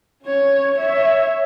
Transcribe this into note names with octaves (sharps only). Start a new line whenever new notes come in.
C#4 C#5
C#5 E5